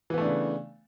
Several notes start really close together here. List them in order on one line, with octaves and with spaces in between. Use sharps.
E3 B3 A3 D4 C#3